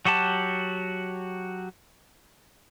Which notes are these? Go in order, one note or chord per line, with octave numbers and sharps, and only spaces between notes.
F#3 F#4 G4 A5